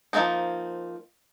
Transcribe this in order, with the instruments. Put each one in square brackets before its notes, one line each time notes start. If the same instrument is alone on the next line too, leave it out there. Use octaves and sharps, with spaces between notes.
[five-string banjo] F3 A3 A#3 C4 D#4